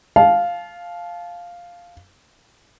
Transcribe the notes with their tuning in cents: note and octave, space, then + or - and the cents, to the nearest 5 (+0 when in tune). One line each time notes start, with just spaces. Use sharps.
F5 +0 A5 -30